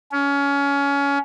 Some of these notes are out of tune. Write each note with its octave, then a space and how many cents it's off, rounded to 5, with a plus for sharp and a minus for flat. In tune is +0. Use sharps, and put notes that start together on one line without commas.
C#4 +25